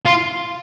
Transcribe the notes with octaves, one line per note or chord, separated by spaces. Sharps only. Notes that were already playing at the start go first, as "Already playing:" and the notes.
F4